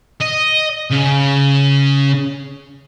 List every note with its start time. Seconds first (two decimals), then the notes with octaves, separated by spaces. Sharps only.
0.21 D#5
0.91 C#3